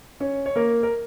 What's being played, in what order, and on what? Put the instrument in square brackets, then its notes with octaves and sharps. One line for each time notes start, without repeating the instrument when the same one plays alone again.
[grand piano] C#4 C#5
C#5
A#3 A#4
A#4